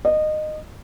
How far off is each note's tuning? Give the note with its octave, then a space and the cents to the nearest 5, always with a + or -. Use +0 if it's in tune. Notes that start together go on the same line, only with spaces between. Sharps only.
D#5 -20